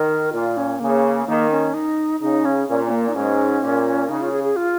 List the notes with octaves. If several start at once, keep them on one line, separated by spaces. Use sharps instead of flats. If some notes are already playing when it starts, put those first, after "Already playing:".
Already playing: D#3 A#4
A#2 F4
C#4
C#3 A#3
D#3 A#3
C#4
D#4
C#3 D#4
C#4
A#2 C#4
C#4
A#3
D#4
G#2 C#4
A#2
C#3 D#4
F4
G#4
G#4
F4